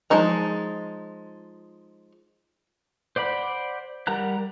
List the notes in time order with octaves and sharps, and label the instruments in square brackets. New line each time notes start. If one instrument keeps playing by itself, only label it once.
[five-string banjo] F3 G#3 D#4 A#5
[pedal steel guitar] C5 D5 F#5 B5
G3 A#4 F#5 A#5 F#6